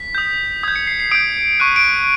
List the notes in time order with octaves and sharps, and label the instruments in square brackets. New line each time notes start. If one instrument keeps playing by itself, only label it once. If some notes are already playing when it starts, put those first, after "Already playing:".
Already playing: [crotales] B6
D#6 G6
D#6 G#6
G6
C#7
C7
C7
D#6 G6 D7
C#6 F#6 D#7
D7